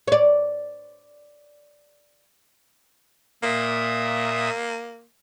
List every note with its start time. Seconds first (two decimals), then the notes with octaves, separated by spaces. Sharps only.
0.08 C#5 D5
3.43 A#2 A#3 E5 D#6